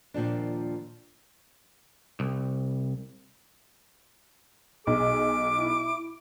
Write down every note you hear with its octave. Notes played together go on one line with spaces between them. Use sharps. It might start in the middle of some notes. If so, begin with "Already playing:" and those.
D#2 A#2 F3 D4
C2
B1 G#4 D6
E4